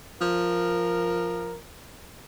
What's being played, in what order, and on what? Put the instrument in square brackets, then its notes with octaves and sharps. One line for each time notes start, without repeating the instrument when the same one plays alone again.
[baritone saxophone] F3 [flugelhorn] A#4